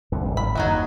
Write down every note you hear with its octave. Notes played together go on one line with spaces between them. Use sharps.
C2 F2 D3
D#1 G#1
B5
F#1 D#2 F#3 D#4 F#4